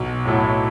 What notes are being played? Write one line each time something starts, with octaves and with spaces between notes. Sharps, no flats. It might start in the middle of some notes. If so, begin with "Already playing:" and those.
Already playing: B1
A2 F#3 A3 E4